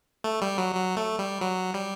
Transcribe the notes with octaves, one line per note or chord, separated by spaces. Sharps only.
A3
G3
F#3
F#3
A3
G3
F#3
G3